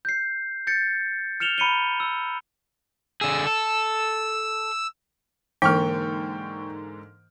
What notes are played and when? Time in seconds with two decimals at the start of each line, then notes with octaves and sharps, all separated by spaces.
0.05 G6 C7
0.67 G6 A6 C#7
1.40 F6 C#7 E7 F7 G7
1.58 A#5 B5 C#7 D#7 G7
2.00 E6
3.21 D3 G#4 E6
3.47 A4
5.62 G#2 D3 E3 A#3 G5 C#6 F6